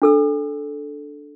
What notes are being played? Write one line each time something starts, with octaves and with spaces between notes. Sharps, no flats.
D4 A4 E6